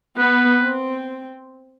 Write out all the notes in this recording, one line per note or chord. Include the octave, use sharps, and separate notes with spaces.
B3 B4
C4